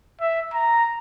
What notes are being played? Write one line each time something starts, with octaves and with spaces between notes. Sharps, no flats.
E5
A#5